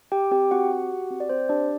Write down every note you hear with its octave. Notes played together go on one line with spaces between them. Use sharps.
G4 G5
C4 G4 G5
C4 F#4 F#5
G4
G4
C4
D5
C4 C5
D4 G4 D5